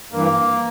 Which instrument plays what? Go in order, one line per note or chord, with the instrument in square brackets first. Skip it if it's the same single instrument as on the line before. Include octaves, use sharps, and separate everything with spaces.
[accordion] G2 E3 A#3